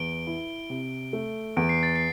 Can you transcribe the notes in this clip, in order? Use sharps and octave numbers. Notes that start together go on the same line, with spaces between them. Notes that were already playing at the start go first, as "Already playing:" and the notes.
Already playing: E2 D7 G7
E4
C3
A3
E2 D7
C7
A6
C7